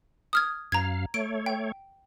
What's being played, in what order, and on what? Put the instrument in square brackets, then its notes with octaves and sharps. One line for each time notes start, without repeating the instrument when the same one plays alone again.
[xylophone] D#6 F6 G#6
[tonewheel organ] F#2 F5 [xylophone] A#5 G#6
[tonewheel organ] A3 C#5 [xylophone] D7
[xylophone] G5